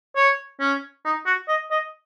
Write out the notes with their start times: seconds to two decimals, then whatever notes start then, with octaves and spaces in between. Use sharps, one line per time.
0.16 C#5
0.60 C#4
1.05 D#4
1.26 F#4
1.48 D#5
1.71 D#5